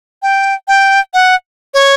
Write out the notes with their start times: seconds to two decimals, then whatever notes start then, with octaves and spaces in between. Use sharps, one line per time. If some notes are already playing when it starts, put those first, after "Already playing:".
0.23 G5
0.68 G5
1.14 F#5
1.74 C#5